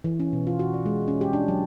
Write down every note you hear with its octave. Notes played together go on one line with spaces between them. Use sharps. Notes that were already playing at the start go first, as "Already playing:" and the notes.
E3
C#4
B2
F4
F#4
D5
G#3
C#4
G4
D4
F#3